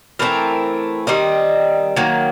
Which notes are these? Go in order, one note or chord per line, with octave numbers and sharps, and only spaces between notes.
E3 A3 C4 A#4
D#3 G3 C4 D#5
D#3 F#3 A#3